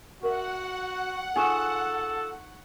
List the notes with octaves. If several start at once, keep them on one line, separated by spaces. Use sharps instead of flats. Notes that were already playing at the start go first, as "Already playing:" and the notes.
F#4 A#4 E5 F#5
D#4 F4 G#4 A4 G#5 C#6 E7